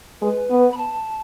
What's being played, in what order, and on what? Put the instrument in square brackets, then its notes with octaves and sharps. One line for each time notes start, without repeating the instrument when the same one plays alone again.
[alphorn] G#3 [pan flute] B4
[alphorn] B3
[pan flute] B5
A5